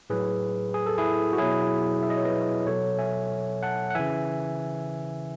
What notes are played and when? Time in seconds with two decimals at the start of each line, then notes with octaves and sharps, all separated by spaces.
0.10 A2 F#3 G#4 B4
0.74 G#4
0.86 A4
0.98 E4 G#4
1.33 F#4
1.38 B2 F#3 E4 G#4
2.02 E5
2.10 D#5
2.17 C#5
2.25 B4 D#5
2.66 B2 F#3 A4 C#5
2.99 E5 G#5
3.63 F#5 A5
3.90 F#5
3.95 C#3 E3 E5 G#5